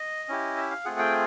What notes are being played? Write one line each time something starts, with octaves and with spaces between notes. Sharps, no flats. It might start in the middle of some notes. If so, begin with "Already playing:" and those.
Already playing: D#5
C#4 E4 G4
E5
F5
A3 C4 F4 G#4 F#5
G5